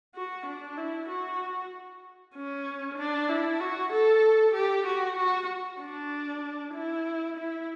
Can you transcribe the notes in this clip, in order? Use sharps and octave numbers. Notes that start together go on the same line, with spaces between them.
F#4
D4
E4
F#4
C#4
D4
E4
F#4
A4
G4
F#4
F#4
D4
E4
E4